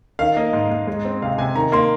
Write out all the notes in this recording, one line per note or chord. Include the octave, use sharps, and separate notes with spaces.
D#3 F5
A#3 D#5
G#2
G#2
G#3
C4
C3 F5
C3 G#5
D#3 A#5
A#3 C6